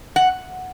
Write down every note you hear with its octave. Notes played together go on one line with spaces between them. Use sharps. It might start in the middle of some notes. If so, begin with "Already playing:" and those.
F#5